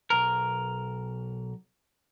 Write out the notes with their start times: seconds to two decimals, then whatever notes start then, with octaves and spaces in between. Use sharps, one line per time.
0.10 B1 A#4